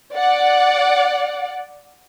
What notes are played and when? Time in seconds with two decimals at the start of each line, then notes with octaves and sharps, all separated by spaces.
0.15 D5 F#5